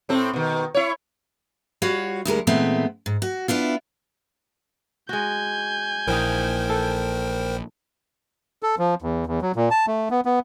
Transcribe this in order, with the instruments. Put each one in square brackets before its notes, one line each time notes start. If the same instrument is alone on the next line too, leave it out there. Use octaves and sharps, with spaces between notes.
[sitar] A2 C4 A4
B2 D#3
E4 C#5
[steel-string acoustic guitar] G3 F4 F#4 C#5 F5 F#5
D2 G3 G#3 A#4
A#2 E3 G#3 A3 B3 C4
G#2
F#4
B3 D4 E4 F4
[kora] G#3 F#4 [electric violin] G#5 G6
[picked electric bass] A#1 [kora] E3 D#4 [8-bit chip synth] A#4 C5 G5
[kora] A4
[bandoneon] A4
F3
E2
E2
F#3
A#2
A5
A3
B3
B3